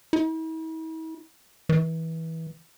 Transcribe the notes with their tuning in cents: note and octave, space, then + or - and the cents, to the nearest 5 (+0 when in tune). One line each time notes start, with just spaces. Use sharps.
E4 -45
E3 -25